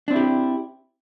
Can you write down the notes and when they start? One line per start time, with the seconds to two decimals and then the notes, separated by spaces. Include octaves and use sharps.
0.08 D4
0.11 C4
0.13 E4
0.16 G4